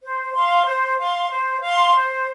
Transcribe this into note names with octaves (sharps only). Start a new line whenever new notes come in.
C5
F5 C6
C5
F5 C6
C5
F5 C6
C5